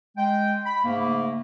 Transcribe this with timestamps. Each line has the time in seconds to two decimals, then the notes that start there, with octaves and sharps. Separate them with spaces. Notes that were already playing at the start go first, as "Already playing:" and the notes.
0.17 G#3 G5
0.66 B5
0.85 G#2 C#3 A3 A#3